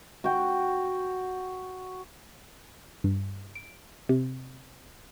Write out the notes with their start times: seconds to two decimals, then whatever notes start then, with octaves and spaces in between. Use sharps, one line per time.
0.24 F#4 G5
3.04 G2
3.55 D7
4.09 C3